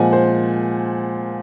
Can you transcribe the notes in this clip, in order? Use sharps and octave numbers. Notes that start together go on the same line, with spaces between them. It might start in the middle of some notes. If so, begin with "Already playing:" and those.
Already playing: A#2 F3 G#3 F#5 G#5
C5